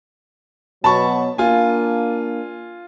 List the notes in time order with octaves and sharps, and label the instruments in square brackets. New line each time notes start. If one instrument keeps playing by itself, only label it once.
[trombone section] B2 F#3 [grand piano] A5 B5 C#6
[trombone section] A#3 D4 [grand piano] F4 G#5